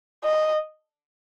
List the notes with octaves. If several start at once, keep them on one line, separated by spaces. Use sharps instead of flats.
D#5